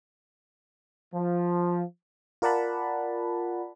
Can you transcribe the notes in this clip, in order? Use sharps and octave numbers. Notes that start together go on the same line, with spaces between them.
F3
F4 A#4 D5 F#5 A5 B5